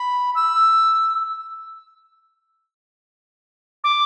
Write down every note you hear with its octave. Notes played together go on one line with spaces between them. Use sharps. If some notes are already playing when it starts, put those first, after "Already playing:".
Already playing: B5
E6
D6